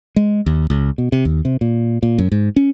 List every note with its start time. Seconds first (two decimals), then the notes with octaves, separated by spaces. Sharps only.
0.16 G#3
0.46 D#2
0.70 C#2
0.98 B2
1.12 C3
1.25 D#2
1.45 C3
1.61 A#2
2.03 A#2
2.18 F#2
2.32 G#2
2.56 C#4